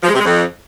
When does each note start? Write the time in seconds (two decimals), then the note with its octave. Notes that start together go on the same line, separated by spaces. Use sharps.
0.03 F3
0.08 G#3
0.14 C3
0.19 G#3
0.25 F2